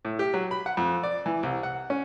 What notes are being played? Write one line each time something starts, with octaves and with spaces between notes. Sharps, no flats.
A2
G4
F#3
B5
F#5
F2
D5
E3
C2
F#5
C#4